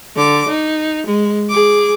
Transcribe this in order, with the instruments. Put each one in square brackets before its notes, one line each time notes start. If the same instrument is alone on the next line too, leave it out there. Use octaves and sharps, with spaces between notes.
[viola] D3 D6
D#4
G#3
G#4 D6